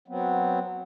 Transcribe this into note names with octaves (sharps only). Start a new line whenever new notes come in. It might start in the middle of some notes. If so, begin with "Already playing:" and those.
F#3 B3 C4